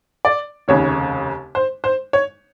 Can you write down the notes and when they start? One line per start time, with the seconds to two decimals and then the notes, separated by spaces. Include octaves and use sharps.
0.25 D5
0.68 F1 D#2 C#3 C#5
1.55 C5
1.84 C5
2.13 C#5